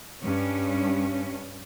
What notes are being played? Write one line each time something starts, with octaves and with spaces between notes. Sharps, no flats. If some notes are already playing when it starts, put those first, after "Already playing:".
G2 C#4